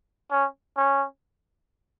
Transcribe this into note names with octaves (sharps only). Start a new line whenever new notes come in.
C#4
C#4